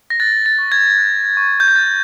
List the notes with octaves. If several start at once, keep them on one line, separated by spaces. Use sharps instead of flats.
A#6
F#6 A6
A6
C#6
G#6
F#6
C#6
G6
G#6
F#6 A6